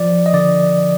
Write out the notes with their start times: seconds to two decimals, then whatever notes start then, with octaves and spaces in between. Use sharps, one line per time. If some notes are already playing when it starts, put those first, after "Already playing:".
Already playing: F3 D5
0.26 D#5
0.33 D3 D5